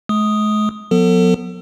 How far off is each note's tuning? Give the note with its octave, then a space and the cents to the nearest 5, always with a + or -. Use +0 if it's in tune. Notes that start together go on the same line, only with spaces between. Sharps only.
G#3 +45 D#6 +0
F#3 -45 B3 +0 A4 +30